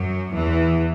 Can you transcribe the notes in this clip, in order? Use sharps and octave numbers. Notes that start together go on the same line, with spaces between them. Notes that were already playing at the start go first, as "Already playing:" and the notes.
Already playing: F#2 F#3
E2 E3